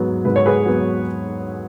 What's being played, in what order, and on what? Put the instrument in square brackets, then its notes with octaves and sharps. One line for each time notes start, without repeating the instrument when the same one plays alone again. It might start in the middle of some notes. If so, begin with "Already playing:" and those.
Already playing: [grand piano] G#2 F#3 B3
[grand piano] G#2 [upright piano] B4
[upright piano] C#5
G#4 B4
[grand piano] F#3 B3